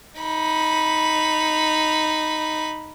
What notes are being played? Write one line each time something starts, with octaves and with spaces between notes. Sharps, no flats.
D#4 B5